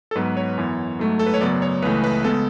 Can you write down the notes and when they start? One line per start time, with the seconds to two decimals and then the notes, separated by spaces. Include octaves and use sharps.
0.11 A4
0.16 G#2 F#3 B3 B4
0.37 C#5
0.58 F#2 E3 B3
0.99 G#2 F#3 A3
1.19 A4
1.26 B4
1.34 C#5
1.41 F#2 C#3 F#3 B3 D5
1.62 C#5
1.82 C#2 C#3 E3 A3 B4
2.04 B4
2.24 C#3 G#3 B3 A4